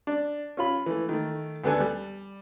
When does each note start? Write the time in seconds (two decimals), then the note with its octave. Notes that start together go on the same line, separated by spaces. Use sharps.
0.07 D4
0.57 C#4 F4 B5
0.86 E3 A3
1.09 D#3 A3
1.64 D2 B3 D4 A4 G#5
1.80 G3